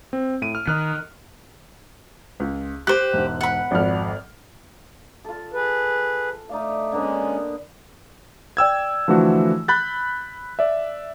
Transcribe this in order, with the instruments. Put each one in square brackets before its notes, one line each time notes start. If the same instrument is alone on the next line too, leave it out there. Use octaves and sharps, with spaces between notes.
[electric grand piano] C4
A2 D7 D#7
F6
[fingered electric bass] D#3 [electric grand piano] D#5 F6 F#6
[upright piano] C#2
[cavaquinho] G4 C5 [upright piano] F#6
[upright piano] E1 G#2
[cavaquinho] F#5 B5
[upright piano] G#1 F2 F6
[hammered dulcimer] F4 A4
[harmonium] G#4 B4
[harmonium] A3 [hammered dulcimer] D#4 D5 F5
[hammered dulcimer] D3 A#3 B3 [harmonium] G#3 C#4
[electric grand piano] D5 G5 E6 G#6
D3 E3 F3 A3 F#4
B5 F#6 G6 A6
D5 E5